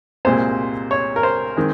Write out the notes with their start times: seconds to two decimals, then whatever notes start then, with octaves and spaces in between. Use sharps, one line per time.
0.25 C2 A#2 G#3 C4 C5
0.91 C#5
1.16 A#4
1.23 C5
1.57 D#3 G#3 C4